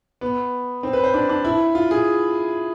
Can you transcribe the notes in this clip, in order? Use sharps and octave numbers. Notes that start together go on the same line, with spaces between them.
B3
C4
B4
C5
D4
D4
E4
F4
G#4